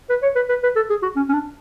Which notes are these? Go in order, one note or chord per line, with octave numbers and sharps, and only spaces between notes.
B4
C#5
B4
B4
B4
A4
G#4
F#4
C#4
C#4
D4